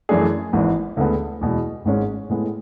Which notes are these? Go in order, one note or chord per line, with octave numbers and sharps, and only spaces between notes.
F#2 E3 A3 D4 G#4
G#1 G#2 E3
D2 D3 G#3 B3
E2 B2 G#3
G#1 G#2 G#3 C#4
A2 G#3 B3